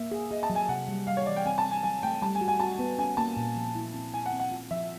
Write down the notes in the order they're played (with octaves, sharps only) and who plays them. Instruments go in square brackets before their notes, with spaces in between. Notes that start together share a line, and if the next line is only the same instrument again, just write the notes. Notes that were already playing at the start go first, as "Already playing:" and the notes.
Already playing: [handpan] A#3 [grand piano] E5
[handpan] G#4
[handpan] G#4 [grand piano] D#5
[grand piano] A5
[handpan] F#3
[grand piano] G#5
[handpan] C3 [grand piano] F#5
[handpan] G3
[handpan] G3 [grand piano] F5
[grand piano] C#5
[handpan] E3 [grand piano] D5
[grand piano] G5
[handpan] C4 [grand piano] G#5
[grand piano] A5
[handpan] C4
[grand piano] G#5
[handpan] F#3 [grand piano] G#5
[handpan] A3 [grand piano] G5
[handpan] G3 [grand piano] A5
[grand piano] G#5
[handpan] F#4
[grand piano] G#5
[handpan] F#4 [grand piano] A5
[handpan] B3
[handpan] C#4 [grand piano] G#5
[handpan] A#3 [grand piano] A5
[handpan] A#2
F3
E4
C4
[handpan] E4 [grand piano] G#5
[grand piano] F#5
[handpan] C4
[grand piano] F#5
[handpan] F4
[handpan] F3 [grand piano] E5